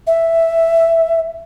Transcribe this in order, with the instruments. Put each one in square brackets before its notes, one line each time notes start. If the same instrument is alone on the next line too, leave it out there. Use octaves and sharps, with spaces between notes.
[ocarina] E5